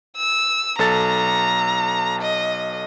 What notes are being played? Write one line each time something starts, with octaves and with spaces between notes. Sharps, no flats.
E6
B1 A4 A#5 A6
D#5